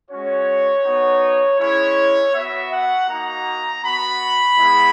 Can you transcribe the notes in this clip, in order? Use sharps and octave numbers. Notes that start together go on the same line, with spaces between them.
G#3 C#4 F#4 C#5
B3 D#4 F#4
G#3 C#4 E4 C#5
B3 F#4 E5
F#5
A#3 D#4 F#4 A#5
B3 F#4 B5
G#3 B3 E4